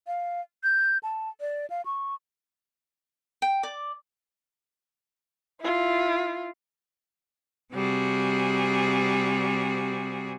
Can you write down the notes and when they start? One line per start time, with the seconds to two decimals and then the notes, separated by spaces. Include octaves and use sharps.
0.07 F5
0.64 G6
1.03 A5
1.41 D5
1.70 F5
1.86 C#6
3.42 G5
3.63 D5 D6
5.60 E4 F4
7.74 C3 G3 F#4 G#4